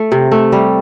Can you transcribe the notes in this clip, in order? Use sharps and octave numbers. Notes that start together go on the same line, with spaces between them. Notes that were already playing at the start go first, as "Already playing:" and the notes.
Already playing: A3
C3
A3
G3